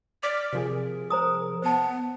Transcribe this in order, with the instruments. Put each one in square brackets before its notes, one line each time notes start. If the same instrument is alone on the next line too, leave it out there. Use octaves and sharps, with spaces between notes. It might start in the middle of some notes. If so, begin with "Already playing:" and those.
[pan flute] D5 [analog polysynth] D6 F6 B6
[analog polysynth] C3 F3 G#4 [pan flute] A#4
[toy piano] C5 A#5 D#6
[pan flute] B3 [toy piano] C5 A5